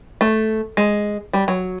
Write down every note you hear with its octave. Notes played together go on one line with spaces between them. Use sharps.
A3
G#3
G3
F#3